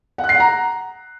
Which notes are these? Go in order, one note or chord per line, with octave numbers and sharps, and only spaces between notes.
F#5
F#6
C7
F#5
A#5